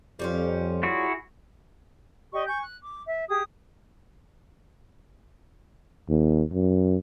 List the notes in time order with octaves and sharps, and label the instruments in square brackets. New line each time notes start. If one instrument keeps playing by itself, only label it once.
[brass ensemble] F2 [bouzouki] G3 C#4 F4
[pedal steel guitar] E4 F#4 G#4
[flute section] G4 D5 D#5 C#6
G#5 C#6 G6
F#6
D6
E5
G4 G#4 D#6
[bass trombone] D#2
F#2